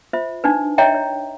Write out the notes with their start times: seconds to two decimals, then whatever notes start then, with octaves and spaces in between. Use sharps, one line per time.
0.13 F4 C5 E5
0.44 D4 D#4 B4
0.78 C#5 D#5 E5 G5 A#5
0.95 C#5